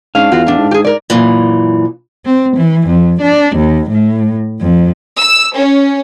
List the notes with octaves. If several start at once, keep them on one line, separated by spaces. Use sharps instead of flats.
G#2 C#4 D4 F5
E2 F4 F#4
A2 D4
G#2
G4 G#4
A#4 D5
F#2 A#2 E3
C4
E3
F2
D4
D#2
A2
F2
E6
C#4